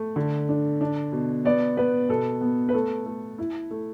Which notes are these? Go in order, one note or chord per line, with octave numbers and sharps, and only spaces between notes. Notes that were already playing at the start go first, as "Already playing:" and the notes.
Already playing: A3
D3
D4
D4
B2
B3 D5
B3 B4
B2 A4
B3
B4
A3 A4
A3
E4
A3